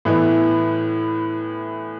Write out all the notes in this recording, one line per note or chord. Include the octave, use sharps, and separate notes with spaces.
A2 E3 B3 E4